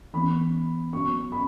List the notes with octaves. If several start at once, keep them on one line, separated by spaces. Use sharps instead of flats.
E3 B3 B5
B2 F#3 B3 C#6
B5